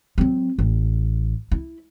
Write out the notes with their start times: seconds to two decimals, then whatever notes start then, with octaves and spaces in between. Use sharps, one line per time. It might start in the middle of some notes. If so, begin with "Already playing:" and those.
0.18 F#3 C4
0.58 A1
1.51 E4